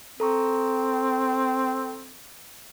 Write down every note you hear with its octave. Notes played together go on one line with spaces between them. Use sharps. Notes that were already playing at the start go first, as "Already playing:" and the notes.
C4 A4 A#5 C#6